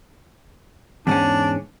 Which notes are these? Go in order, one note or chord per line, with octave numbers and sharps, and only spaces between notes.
E2 G#2 C#4 D4